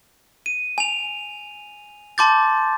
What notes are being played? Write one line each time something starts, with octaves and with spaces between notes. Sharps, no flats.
D#7
G#5 F7
A5 C6 D6 G6 A6